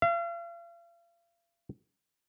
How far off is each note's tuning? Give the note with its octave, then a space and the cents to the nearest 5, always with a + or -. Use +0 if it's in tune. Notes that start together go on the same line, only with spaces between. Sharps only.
F5 -40